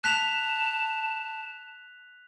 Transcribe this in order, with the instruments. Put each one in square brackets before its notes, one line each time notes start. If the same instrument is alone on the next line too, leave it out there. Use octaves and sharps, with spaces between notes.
[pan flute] A5 [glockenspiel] F#6 B6 F7